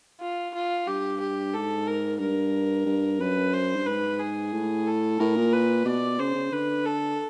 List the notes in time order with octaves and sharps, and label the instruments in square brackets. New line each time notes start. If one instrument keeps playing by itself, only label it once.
[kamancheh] F4
F4
[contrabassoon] G2 [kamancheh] G4
[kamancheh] G4
[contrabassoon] G#2 [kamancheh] A4
[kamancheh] A#4
[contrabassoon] G2 [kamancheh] A#4
[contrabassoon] G2
[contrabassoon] F#2 [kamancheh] B4
[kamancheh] C5
[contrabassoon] G2
[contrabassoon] G#2 [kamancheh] B4
[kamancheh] G#4
[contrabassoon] A2
[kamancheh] A4
[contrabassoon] A2 [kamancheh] A#4
[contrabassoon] A#2
[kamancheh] B4
[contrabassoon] B2 [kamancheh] D5
[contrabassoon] C#3 [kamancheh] C5
[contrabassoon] C#3
[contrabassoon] D3 [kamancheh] B4
[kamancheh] A4